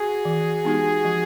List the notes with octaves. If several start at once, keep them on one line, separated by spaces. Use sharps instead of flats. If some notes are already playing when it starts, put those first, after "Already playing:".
Already playing: F#4 G#4
E3
G#3 B3 D#4 G4
F3